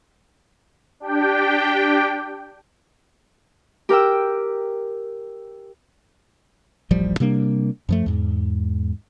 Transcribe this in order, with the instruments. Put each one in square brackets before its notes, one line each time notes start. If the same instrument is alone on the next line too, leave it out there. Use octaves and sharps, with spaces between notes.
[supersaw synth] D4 G4 G5
[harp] G4 A#4 G5 E6
[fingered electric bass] D1 A1 F3 G3
C3 G3 A#3 D4
F#2 F3 A3
E2 G#2